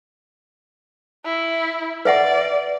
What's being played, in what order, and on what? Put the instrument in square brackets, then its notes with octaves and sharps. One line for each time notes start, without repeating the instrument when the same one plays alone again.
[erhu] E4
[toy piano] B4 E5 F#5 [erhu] D5